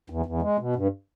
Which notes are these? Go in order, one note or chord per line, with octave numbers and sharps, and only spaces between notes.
E2
E2
G#3
B2
G2